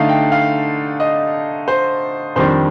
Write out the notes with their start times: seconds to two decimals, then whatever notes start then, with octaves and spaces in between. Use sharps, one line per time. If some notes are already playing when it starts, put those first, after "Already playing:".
Already playing: D3 A3 D#4 F5
0.09 G5
0.32 F5
1.00 D#5
1.68 C5
2.35 F2 D#3 G3 D4 C5